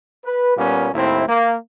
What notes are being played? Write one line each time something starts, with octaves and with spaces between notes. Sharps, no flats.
B4
A#2 G3 A#3 B3 C#4
D#2 A2 C4 E4
A#3